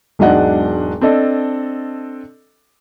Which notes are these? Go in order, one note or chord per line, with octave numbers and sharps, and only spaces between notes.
E1 G#2 F#3 D4 D#5 F#5
C4 D4 A4 D#5